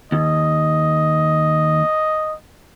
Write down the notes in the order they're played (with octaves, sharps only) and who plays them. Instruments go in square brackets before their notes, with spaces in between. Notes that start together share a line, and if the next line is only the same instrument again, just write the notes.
[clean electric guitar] D#2 [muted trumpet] D#5